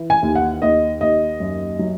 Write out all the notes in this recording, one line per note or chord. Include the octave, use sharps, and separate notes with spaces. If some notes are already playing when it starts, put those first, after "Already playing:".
Already playing: E3
G#5
D#2
F#5
D#2 D#5
D#2 D#5
F#2
F#3